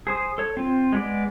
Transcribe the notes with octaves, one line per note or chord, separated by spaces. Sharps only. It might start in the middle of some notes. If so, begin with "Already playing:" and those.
G#4 C5 D#6
A4 C#5
C4 F4
G#3 B3 D5